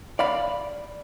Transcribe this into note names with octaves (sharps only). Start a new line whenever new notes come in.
D5 F5 B5